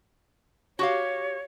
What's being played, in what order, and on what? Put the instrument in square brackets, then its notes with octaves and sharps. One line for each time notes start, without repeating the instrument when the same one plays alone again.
[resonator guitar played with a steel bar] F#4 G4 F5 [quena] C#5